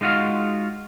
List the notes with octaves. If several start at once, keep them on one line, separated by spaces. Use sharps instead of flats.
G#3 D#4 F4 F#4 F5